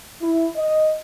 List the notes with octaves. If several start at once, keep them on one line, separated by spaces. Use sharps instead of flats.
E4
D#5